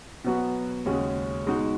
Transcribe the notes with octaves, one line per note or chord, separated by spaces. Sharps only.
B2 F#3 B3 F#4
D#2 C#3 G#3 C#4 F#4
B2 G#3 D#4 F#4